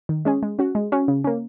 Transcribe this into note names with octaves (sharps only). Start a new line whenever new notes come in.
D#3
G#3 C#4 G#4
G#3
C#4 F#4
G#3
C#4 F#4
C#3
A#3 C#4